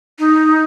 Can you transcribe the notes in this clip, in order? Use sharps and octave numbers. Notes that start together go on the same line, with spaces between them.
D#4